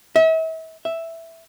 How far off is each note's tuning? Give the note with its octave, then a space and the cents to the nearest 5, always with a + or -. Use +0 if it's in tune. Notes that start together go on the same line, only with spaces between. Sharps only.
E5 -40
E5 +0